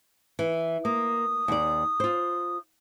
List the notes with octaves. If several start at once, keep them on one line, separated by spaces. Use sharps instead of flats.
E3
A#3 D#6
D#2 D5
F4 C5